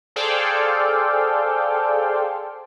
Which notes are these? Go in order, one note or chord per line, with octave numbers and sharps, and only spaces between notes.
G#4 A4 C5 D5 F5 G5